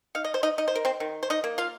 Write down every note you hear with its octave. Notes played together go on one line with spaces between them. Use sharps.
D#4 F5
D#5
C5
D#4 D#5
D#4 D#5
C5
A#4
C4 C5
D#3
C5
D#4 D#5
A#3
F4 F5